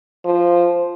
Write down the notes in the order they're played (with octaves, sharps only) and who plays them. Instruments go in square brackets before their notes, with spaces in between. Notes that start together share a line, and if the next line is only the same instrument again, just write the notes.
[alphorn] F3